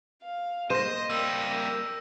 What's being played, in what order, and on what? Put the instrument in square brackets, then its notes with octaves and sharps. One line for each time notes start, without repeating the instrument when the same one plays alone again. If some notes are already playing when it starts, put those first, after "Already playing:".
[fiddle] F5
[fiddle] A#3 [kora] C5 [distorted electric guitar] D#5 [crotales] A#6 E7
[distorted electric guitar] G3 A#3 [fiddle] A#4 [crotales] E6